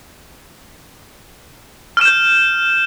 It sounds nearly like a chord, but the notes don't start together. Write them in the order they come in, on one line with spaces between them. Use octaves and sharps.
F6 E7 G6